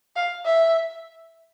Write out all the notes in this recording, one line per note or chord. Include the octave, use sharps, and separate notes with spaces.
F5
E5